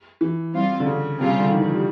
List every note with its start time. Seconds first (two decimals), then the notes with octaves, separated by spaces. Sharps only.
0.21 E3
0.54 G3 C4 F4
0.80 D3
0.86 C#3
1.19 C3 G3 C4 F4 G#4
1.29 C#3
1.39 D3
1.51 D#3
1.58 E3
1.67 F3
1.74 G3